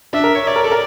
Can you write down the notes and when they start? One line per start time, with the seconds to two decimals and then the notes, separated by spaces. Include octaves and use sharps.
0.13 D4 E5
0.24 A#4
0.35 C#5
0.47 C#5 D5
0.56 A#4
0.64 A4
0.71 A#4